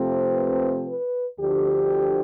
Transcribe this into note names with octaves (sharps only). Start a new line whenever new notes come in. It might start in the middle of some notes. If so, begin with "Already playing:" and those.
Already playing: C3 F3 A3 C4
B4
B4
D2 D3 F3 G4